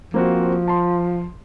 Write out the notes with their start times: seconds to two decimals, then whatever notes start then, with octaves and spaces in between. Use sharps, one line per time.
0.14 F3 A#3 C4 F#4
0.68 A5 C6